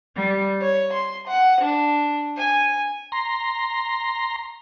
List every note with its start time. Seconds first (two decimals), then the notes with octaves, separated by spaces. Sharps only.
0.16 G3
0.61 C#5
0.92 C6
1.27 F#5
1.60 D4
2.37 G#5
3.12 A#5 C6